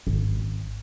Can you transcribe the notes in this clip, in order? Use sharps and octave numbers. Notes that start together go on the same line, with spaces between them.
G#1